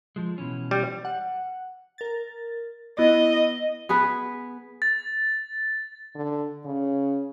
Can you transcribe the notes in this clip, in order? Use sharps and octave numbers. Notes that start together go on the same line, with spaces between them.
F3 G#3
B2 E3 C#4
G3
F#5
A#4 A6
B3 E4 D#5
B3 G#4 B4
A6
D3
C#3